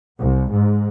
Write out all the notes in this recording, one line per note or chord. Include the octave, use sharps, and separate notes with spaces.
C2
G#2